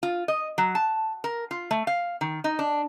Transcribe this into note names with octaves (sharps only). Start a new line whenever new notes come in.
F4
D#5
F#3
A5
A#4
F4
A3
F5
D#3
D#4
D4